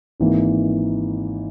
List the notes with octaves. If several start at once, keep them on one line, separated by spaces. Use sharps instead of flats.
G#1 G#2 E3 A#3